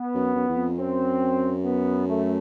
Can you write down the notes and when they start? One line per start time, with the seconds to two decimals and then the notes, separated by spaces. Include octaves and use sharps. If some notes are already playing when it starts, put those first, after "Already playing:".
Already playing: B3
0.14 F#2
0.35 F#2
0.49 E2
0.57 F2
0.78 F#2 C4
1.64 B3
2.07 A3